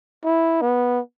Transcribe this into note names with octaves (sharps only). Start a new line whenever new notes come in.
E4
B3